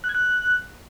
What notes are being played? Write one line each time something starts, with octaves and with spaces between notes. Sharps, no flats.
F#6
G#6
F#6